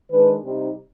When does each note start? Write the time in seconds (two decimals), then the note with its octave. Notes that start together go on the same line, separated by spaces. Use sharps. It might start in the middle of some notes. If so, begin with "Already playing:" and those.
0.10 D#3 G#3 D4 B4
0.42 C3 G3 C4 D#4